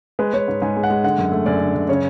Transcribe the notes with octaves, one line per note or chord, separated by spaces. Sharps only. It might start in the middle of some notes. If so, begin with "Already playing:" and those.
G#3 B4
G#3 C#5
G#2
G#2 G#5
G#3
F#5
G#3
D3 F#5
F#2
A3
F#2 D5
D3
F#2
C#3 C#5